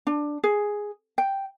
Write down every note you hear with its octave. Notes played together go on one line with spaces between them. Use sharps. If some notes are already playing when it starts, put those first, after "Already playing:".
D4
G#4
G5